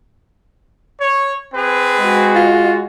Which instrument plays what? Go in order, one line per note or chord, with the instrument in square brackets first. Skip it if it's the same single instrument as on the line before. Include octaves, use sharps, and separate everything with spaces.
[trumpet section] C#5
C4 G#4 B4
[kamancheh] G#3 F#4
[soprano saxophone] F4